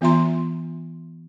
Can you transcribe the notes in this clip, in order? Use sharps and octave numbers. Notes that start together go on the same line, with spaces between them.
E3 B3 F4 E5 A#5 C6